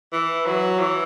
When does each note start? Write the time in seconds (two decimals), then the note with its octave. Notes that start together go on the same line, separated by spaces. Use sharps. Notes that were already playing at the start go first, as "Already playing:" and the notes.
0.13 E3
0.46 F#3
0.79 E3